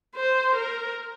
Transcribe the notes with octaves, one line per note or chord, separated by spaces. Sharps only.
C5
A#4